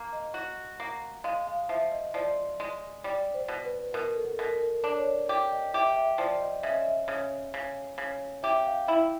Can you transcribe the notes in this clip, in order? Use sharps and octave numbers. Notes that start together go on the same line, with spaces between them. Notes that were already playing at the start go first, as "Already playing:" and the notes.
Already playing: A#3
D#5
F#4
A#3
G#3 F5
F5
F3 E5
D#5
F3 D5
G#3
G3 D5
C5
B2
B4
B2 A#4
A4
B2 A#4
A#4
D4
C#5
D5
G4
D#5
G4 E5
E5
F3 D5
D#5
C#3 E5
D#5
E5
C#3
C#3
C#3
G4 E5
F5
E4 E5